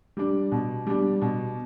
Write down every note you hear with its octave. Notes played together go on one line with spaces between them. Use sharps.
G3 D4
B2
G3 D4
B2